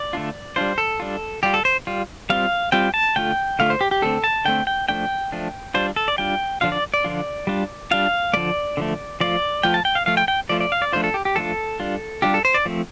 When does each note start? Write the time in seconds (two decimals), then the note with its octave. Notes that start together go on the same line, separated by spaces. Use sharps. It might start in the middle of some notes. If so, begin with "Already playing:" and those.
Already playing: D5
0.13 D3 A3 D4 F4
0.56 G3 D4 F4 C5
0.78 A4
1.00 G3 D4 F4
1.43 G3 F4 G4
1.54 A4
1.65 C5
1.87 G3 F4
2.30 G3 C4 F4 F5
2.72 G3 C4 F4 G5
2.94 A5
3.16 D3 A3 F4 G5
3.59 D3 A3 F4 F5
3.70 C5
3.81 G4
3.91 G4
4.02 D3 A3 C4 A4
4.24 A5
4.45 D3 A3 C4 G5
4.67 G5
4.89 F3 A3 D4 G5
5.32 F3 A3 D4
5.74 G3 D4 F4 C5
5.96 A4
6.08 D5
6.18 G3 D4 F4 G5
6.61 D3 F3 D4 F4 F5
6.72 D5
6.94 D5
7.04 D3 F3 D4 F4
7.47 G3 D4 F4
7.91 G3 D4 F4 F5
8.33 D3 F3 A3 D5
8.77 D3 F3 A3
9.20 F3 A3 F4 D5
9.63 F3 A3 F4 G5
9.74 A5
9.85 G5
9.95 F5
10.06 F3 A3 F4 F5
10.17 G5
10.28 G5
10.49 F3 A3 F4 D5
10.61 D5
10.72 F5
10.82 D5
10.93 F3 A3 D4 F4 C5
11.04 A4
11.14 G4
11.25 G4
11.36 F3 A3 D4 F4 A4
11.80 G3 D4 F4
12.22 G3 D4 F4 G4
12.34 A4
12.45 C5
12.54 D5
12.66 F3 A3 C4